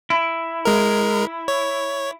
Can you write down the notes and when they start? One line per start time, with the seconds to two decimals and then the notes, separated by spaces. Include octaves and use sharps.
0.10 E4
0.65 G#3 A#4
1.48 C#5